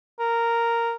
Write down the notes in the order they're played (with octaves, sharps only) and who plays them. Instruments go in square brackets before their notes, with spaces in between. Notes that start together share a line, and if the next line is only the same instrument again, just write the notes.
[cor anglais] A#4